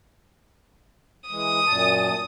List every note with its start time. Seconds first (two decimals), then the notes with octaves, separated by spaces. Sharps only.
1.30 E3 G#3 D#6
1.67 F#2 A#2 A5